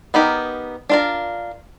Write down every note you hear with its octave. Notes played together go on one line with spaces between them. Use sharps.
B3 D#4 G4 A#4
D4 F4 A#4